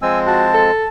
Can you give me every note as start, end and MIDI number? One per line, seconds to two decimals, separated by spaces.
0.02 0.71 53
0.02 0.71 56
0.02 0.71 60
0.02 0.19 80
0.02 0.19 88
0.27 0.46 66
0.27 0.88 81
0.54 0.85 69